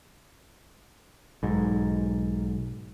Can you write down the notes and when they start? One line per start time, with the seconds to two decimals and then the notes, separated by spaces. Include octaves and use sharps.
1.43 B1 G#2